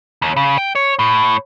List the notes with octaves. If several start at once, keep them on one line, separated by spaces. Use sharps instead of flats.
D#2
C#3
G5
C#5
A2